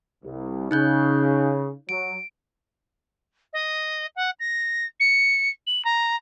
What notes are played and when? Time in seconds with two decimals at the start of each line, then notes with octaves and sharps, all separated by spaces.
0.24 C2
0.71 C#3 D#4 F#6 G6
1.89 F#3 D7
3.53 D#5
4.16 F#5
4.40 A#6
5.00 C#7
5.67 F#7
5.85 A#5